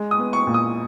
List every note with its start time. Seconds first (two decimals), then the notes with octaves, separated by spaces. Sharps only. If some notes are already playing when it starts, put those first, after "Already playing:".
Already playing: G#3
0.11 D#6
0.19 B3
0.33 C#6
0.47 A#2
0.54 D#6